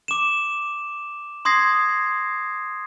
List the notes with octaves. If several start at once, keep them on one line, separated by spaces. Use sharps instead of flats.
D6 E7
C6 D#6 G#6 A#6 C7